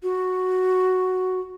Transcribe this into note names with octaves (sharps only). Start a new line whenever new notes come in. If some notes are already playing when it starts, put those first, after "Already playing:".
F#4